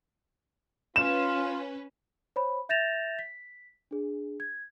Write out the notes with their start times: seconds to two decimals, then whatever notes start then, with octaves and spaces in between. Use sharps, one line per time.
0.96 C#4 F4 B4 E7
2.36 C5 C#5 B5
2.69 E5 G6 A6 A#6 E7 F7
3.19 B6
3.91 D4 G#4
4.40 G#6